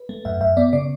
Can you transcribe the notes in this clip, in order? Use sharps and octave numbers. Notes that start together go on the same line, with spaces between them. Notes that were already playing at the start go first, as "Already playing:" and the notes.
Already playing: B4
A3
F#2 E5
F#2 E5
B3 D5
C#3 D5